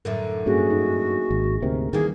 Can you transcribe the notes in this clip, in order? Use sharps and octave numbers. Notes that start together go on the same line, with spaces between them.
F#2 A2 D3 A#4 E5
G2 A#3 C#4 F#4 G#4
D#4
G#1
D2 G#2 C3 A#4
D#3 E3 G3 A#3 G#4